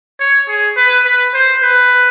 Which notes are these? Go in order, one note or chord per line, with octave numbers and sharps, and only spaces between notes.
C#5
G#4
B4
B4
C5
B4